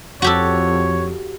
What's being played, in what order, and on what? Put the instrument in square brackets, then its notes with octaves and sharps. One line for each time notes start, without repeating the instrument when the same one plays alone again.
[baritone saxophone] F2 [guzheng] F#4 G4 A4 [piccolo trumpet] C#5